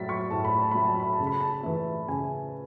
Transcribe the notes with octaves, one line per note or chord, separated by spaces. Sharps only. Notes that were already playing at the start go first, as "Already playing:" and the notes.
Already playing: A2 F#3 A3 A6 B6
C#6
A2 A5
B5
A5
F#3 A3 B5
A5
B5
A5
C#3
B5
A5
E3 A3
C#3 G#5